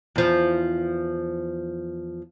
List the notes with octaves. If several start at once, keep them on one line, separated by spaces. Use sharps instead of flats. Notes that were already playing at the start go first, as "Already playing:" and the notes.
E2 F3